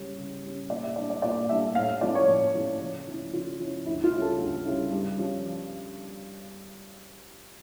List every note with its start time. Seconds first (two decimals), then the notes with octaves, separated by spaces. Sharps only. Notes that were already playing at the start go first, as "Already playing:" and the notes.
Already playing: C#3 G3 C#4
0.18 C#3
0.43 G3 C#4
0.70 A#2 D5
0.83 E5
0.96 G3 D4 D5
1.10 D5
1.22 A#2 D5
1.49 G3 D4 E5
1.75 A2 F5
2.01 F3 A3 C#4 E4 D5
2.15 C#5
2.28 A2
2.55 F3 A3 C#4 E4
2.81 C#3
3.07 F3 C#4 E4
3.33 C#3 F4
3.60 F3 C#4 E4
3.86 D2 E4
4.04 F4
4.12 C#3 G3 C#4 E4
4.22 A4
4.38 D2
4.65 C#3 G3 C#4 E4
4.91 G2
5.18 F3 C#4